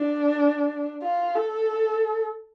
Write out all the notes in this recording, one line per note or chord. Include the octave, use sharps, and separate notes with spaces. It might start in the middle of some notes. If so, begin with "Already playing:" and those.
Already playing: D4
F4
A4